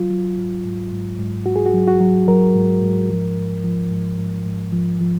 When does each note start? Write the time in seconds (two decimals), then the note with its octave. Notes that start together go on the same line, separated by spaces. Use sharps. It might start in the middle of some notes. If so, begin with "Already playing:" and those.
Already playing: F#3 F4
0.10 F#3
0.37 G#2
0.65 G#2
0.92 G#2
1.19 G#2
1.46 G#2 F#4
1.56 G#4
1.66 F#4
1.74 F#3
1.87 F#4
2.00 F#3
2.28 F#3 A#4
2.55 G#2
2.82 G#2
3.10 F3
3.37 G#2
3.64 F3
3.91 G#2
4.18 G#2
4.46 G#2
4.73 F3
5.01 F3